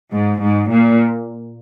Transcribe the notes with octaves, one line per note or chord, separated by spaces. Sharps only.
G#2
G#2
A#2